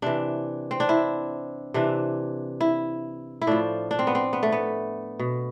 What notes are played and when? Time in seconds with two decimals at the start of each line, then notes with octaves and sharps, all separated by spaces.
0.02 C3 E3 D4
0.71 C4
0.80 D4
0.89 E4
1.74 C3 E3 D4
2.61 E4
3.42 E4
3.47 A2 F3 D4
3.91 D4
3.99 C4
4.07 B3
4.15 C4
4.33 B3
4.43 A3
4.52 B3
5.19 B2